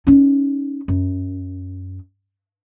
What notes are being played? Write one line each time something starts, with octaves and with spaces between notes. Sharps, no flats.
C#4 D#4
F#2